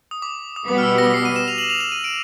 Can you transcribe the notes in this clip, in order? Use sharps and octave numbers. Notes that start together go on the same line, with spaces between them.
D#6
D6
D#6
B2 G3 B3 D6
F6
E6
A#6
C7
D#7
E7
F7
F#7
F7
E7
D#7
D7